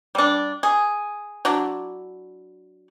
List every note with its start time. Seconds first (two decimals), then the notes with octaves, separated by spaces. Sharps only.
0.15 G3 D4
0.63 G#4
1.45 F#3 D4 E4